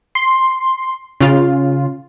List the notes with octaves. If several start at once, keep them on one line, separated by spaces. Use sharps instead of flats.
C6
C#3 F4